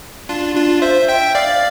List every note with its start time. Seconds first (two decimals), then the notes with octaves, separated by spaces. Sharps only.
0.29 D4 F4
0.55 D4 F4
0.82 C5 E5
1.09 E5 G5
1.35 D5 F5